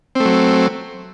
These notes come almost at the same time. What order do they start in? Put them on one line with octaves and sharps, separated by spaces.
C4 A3 F#3